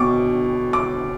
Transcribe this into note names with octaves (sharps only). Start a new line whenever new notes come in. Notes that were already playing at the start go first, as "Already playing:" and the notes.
Already playing: B2 C#6 D6
D6